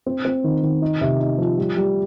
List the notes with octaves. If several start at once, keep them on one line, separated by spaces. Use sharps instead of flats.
C4
C4
D#3
D#3
D#4
C3
D#4
F3
G3
G3